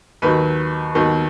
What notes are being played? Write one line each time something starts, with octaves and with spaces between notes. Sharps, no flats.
D#2 D#3 F#3 B4
D#2 D#3 F#3